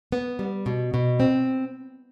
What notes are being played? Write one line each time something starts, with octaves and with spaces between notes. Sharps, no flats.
B3
G3
B2
B2
C4